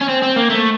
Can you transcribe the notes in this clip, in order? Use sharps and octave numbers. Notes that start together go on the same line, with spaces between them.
C#4
C4
C4
A#3
A3